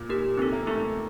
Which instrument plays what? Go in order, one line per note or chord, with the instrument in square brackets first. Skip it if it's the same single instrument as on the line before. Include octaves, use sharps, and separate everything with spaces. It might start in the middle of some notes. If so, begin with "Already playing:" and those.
Already playing: [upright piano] A#2
[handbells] A#3 D#4 G4 A#4
[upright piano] C3 [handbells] C4 D#4 A4
[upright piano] A#3
[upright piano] A3 [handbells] C4 D#4 A4